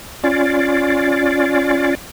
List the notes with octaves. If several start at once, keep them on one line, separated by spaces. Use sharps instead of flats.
C#4 F4 D5